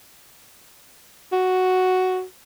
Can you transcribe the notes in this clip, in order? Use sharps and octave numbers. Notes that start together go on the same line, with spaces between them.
F#4